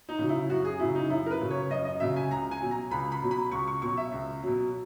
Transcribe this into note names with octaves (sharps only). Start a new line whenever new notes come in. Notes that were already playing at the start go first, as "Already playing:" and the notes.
D#4
C#3 F#3
E4
F#2 F#4
G#4
C#3 F#3 E4
D#4
F#2 E4
A#4
B4
C#3 F#3
C#5
F#2 D#5
D#5
C#3 F#3 E5
G#5
C#2 A#5
G#5
B2 F#3
A#5
C#2 B5
B5
B2 F#3
B5
C#2 C#6
C#6
B2 F#3 C#6
E5
C#2
B2 F#3